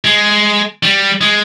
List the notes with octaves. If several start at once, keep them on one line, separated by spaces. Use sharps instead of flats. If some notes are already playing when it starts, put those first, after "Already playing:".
G#3
G3
G#3